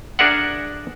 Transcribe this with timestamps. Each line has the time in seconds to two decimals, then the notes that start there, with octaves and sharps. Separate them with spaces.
0.19 D4 G#4 A#4 D5 E5 F#5